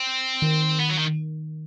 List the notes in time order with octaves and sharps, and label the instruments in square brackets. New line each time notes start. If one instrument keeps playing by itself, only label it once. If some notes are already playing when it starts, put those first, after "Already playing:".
Already playing: [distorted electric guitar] C4
[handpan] D#3
[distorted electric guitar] B3
F#3
D#3